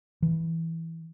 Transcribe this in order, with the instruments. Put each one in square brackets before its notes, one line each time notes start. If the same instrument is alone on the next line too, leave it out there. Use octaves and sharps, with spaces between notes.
[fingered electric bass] E3